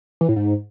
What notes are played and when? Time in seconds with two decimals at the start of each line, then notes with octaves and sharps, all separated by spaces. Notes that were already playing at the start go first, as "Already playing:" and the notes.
0.21 E3
0.29 A2
0.36 G#2